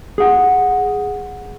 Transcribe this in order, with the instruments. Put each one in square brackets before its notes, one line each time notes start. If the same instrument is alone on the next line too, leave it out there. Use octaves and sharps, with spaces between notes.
[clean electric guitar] G#4 F#5